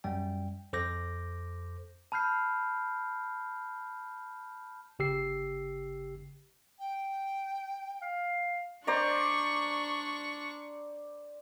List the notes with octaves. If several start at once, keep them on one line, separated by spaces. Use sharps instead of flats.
F#2 G3 G5
F2 A4 C5 D6 G6 A#6
A5 B5 F6 G6 C7
G1 C#3 G4 E6 C7
G5
F5
D4 C5 D5 A#5 C#6